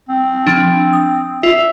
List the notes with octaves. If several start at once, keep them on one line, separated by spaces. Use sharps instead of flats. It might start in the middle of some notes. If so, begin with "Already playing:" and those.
C4
F3 D4
D#6
F4 E5